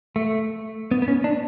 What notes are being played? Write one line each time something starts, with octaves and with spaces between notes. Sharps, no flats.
A3
B3
B3
C#4
D4